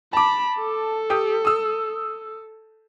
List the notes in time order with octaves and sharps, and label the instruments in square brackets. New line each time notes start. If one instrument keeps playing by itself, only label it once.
[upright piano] A5 D6 [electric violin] B5
[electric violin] A4
[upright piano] G4 G5 D#6
D#6 E6